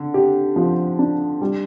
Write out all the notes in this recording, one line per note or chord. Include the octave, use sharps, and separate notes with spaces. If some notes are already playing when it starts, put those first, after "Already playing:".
Already playing: D3
G4
F3
D4
G3